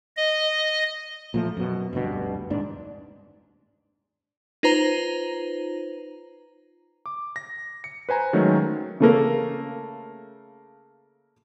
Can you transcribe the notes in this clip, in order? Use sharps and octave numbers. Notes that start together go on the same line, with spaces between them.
D#5
A#2 F3 A3
F#2 B2
F1 D2 G2 B2
D#1 G#2 D4
D#4 F4 B4 C5 A#5
D6
A#6
C#7
B4 C5 G#5 A#5
D#3 F#3 G#3 A3 C#4
C#3 A3 A#3